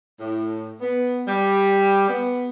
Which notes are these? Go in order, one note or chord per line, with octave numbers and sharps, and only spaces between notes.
A2
B3
G3
B3